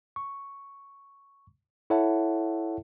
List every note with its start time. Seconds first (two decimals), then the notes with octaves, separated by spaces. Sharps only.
0.16 C#6
1.90 E4 A4 C#5 E5 F#5 A5